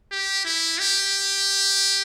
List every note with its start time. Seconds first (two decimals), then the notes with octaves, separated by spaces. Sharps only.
0.12 G4
0.45 E4
0.79 G4